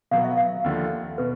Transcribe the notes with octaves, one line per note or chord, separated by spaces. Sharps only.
B2 F#3 B3 F5
E5
F5
D#2 D3 F3
B2 B4